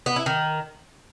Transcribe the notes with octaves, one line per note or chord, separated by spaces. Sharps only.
B3
E4
D#3